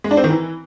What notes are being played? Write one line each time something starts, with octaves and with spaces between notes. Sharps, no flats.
G#3
D4
C4
D#3
E3